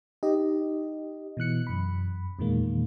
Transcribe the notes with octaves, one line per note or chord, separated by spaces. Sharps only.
D#4 G4 D#5
B2 E3 F#6 C#7
F#2 B5
E2 A#2 D#3 G#3 A#3